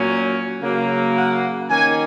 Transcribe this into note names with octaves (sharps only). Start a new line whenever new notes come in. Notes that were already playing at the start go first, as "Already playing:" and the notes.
Already playing: A#2 F#3 A#3 C#4
C#3 F#3 A#3
F#5
D#3 A#3 C#4 G#5